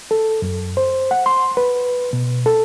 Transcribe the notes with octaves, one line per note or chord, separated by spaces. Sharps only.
A4
F#2
C5
F#5
C6
B4
B2
A4